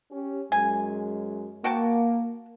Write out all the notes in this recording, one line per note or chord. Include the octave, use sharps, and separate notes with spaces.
C#4 G4
F#2 G#3 G#5
A#3 F#4 G5 A5